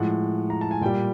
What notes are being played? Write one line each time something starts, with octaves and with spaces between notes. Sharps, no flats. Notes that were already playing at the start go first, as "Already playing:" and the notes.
Already playing: A2 F3 G#3 F#5
A#5
A5
G#5
A#2 G3 G5